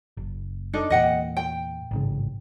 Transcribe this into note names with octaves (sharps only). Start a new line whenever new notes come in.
F#1
D4 D#4 A4
E2 A#2 D#5 F#5 G5
G5
A1 G#2 C#3